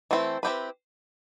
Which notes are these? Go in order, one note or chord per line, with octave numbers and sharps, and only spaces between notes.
E3 A3 C4 E4
C4 E4 G4 B4